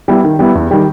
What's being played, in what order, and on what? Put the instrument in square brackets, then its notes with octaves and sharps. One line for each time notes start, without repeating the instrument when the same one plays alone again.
[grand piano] G3 B3 E4
D#3
G3 B3 E4
E2
D#3 G3